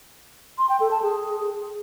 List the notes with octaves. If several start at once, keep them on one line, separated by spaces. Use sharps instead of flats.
C6
G5
A4
A5
G#4